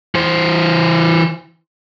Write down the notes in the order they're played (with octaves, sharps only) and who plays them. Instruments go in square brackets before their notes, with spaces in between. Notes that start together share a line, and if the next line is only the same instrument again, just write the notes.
[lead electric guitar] E3 C5